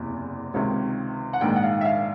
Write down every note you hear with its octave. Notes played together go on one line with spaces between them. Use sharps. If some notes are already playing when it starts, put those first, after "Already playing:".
Already playing: F#1 E2 C3
C#2 C3 D#3 C#5
F#5
A#1 G#2 D#3 G5
F#5
F5
E5
F5